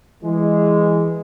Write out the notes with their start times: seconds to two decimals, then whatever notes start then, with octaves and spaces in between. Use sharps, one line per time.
0.24 E3 G#3